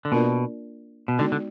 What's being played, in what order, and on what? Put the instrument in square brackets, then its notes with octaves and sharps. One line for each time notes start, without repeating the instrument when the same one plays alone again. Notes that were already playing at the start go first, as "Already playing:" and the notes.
[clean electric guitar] D3
[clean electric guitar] B2 [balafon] A#3 D4 F4 A#4 D5
[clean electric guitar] B2
[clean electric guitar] D3 [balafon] G#3 B3 D#4 F#4 D5
[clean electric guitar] D3